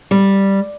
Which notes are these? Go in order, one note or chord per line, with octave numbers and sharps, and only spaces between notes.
G3